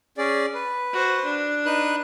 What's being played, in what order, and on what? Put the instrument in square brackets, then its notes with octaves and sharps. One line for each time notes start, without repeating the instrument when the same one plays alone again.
[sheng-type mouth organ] C#4 G#4 D5
B4
[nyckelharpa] F#4 C5
D4
[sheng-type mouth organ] D#4 B4 F#6